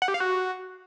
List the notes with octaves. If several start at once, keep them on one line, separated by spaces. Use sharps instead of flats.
F#5
G4
F5
F#4